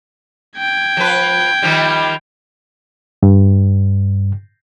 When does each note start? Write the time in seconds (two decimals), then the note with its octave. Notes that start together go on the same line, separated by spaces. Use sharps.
0.58 G5 G#6
0.97 F3 B4
1.62 D#3 F3 G3
3.23 G2